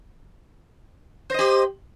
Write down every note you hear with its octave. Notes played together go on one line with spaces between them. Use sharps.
G4 C5 D#5